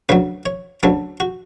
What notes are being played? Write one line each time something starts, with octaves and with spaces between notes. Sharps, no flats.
D2 C#3 F#3 B4
C#5
D2 C#3 F#3 A4
F#4